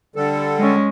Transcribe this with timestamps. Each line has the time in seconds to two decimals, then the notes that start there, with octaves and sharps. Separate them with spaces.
0.16 D3 G3 A4
0.58 G#3 C#4